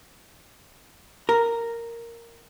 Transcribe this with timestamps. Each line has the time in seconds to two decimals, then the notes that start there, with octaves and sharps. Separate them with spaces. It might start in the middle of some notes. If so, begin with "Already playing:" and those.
1.29 A#4